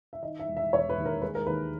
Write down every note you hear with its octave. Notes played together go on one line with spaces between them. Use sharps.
E5
D#3 D#5
E5
E1
E5
E1 C#5
B4
D#2
A#4
G#3 B4
A#4
D#2 B4